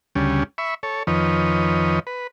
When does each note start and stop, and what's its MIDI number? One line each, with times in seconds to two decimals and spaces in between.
0.15 0.43 38
0.15 0.43 49
0.15 0.43 55
0.15 0.43 61
0.58 0.74 76
0.58 0.74 83
0.58 0.74 85
0.83 1.03 69
0.83 1.03 73
1.07 1.99 41
1.07 1.99 51
1.07 1.99 53
1.07 1.99 71
1.07 1.99 73
1.07 1.99 75
2.07 2.27 71